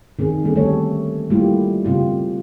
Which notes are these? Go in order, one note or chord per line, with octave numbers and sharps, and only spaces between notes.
D#3 C4 G#4
D3 G3 A#3 C#4 G#4 A4
A3 C4 G4 A4 C#5
G3 A3 A#3 E4 F4 G4
C#3 C4 F4 G4